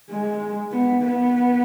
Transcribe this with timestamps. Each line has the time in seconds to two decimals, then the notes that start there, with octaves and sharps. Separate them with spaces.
0.10 G#3
0.72 B3
1.02 B3